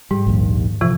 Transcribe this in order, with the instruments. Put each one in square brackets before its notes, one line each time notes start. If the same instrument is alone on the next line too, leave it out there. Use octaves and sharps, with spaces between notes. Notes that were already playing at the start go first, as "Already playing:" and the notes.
[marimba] G#2 [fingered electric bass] G3
[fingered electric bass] A#1 D#2
[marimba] A2 C3 E3 [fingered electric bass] F3